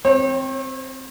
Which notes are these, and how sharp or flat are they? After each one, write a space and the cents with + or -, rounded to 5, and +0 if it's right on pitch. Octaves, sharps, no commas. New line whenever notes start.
C4 +0 C#5 -45